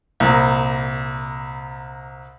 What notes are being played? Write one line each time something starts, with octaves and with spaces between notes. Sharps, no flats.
C2 A#2